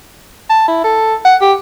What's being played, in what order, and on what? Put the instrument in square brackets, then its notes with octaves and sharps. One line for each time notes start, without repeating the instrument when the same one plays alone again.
[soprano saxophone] A5
E4
A4
F#5
G4